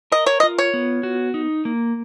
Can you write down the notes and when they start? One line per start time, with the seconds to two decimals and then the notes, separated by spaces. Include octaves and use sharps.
0.12 A#4 D#5
0.26 C#5
0.40 D#5
0.43 F4
0.58 C#5
0.74 B3
1.03 F#4
1.34 D#4
1.65 A#3